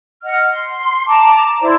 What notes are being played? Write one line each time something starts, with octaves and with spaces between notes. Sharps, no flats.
D#5 F#5 F6
C6
A5 A#5 D6
E4 C5 D5